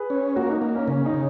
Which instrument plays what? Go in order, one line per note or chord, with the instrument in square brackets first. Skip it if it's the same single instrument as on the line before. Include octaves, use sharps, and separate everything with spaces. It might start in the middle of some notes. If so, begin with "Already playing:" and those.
Already playing: [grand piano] G#4 B4
[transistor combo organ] C#4
[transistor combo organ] A#3 [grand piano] F#4 A#4
[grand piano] D#4
[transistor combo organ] A#3
[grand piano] C#4
[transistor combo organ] C#3 [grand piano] C#4
[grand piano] D#4
[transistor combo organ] C#3